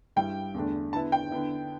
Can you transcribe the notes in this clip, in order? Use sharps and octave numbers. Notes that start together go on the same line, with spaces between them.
G2 G3 E4 G5
E2 D3 A3 D4
D3 B3 E4 A5
G5
D3 B3 E4